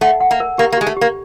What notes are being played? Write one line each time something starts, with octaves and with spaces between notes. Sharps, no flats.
A3 F#5
F#5
A#3
A#4
A#3 G4
A#3
G#3 G4
A3
A#3 G4